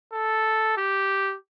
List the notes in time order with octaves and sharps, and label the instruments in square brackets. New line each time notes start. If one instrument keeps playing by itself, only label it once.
[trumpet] A4
G4